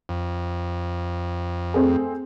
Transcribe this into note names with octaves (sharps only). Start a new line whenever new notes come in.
F2
A3 C4 G#4